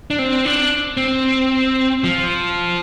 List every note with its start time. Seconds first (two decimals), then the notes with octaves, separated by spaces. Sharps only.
0.10 D4
0.19 C4
0.45 D4
0.97 C4
2.04 F3